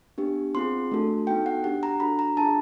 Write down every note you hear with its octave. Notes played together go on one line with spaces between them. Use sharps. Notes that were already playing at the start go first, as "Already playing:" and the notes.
B3 D4 G4
C4 F4 G#4 C6
A3 D4 F#4 A4
B3 D#4 F#4 A4 G5
F#5
D4 G4 F#5
A#5
D4 F#4 A4 B5
A#5
D4 F4 G#4 A5